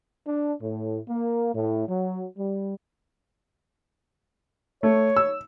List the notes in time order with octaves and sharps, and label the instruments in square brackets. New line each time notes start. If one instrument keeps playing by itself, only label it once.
[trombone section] D4
A2
A#3
A2
F#3
G3
[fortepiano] A3 [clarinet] C#5
[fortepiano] E6